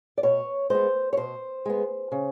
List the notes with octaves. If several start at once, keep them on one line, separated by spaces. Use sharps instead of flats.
D5
B2 C#5
G#3 B3 C5
C#5
B2 C5
G#3 B3
C#3